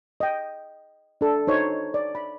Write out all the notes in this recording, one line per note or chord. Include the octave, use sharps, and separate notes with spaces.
D#5 G5
D4 A4
D#4 C5 C#5
D5
B5